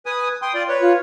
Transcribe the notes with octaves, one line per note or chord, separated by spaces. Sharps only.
B4 G#5 D#6
G5 C6 D#6
F4 D5
B4 C#5
F4